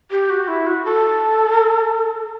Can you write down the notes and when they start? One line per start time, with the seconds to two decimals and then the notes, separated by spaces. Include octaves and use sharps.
0.11 G4
0.30 F#4
0.48 E4
0.66 F#4
0.85 A4